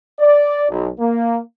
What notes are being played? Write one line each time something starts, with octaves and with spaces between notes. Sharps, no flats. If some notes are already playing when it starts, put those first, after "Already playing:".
D5
B1
A#3